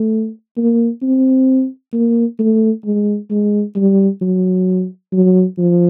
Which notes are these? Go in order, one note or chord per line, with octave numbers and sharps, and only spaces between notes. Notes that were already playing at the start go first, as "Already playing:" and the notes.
Already playing: A3
A#3
C4
A#3
A3
G#3
G#3
G3
F#3
F#3
F3